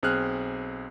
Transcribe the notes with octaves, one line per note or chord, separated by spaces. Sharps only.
B1 C4 G#4 F6 F#6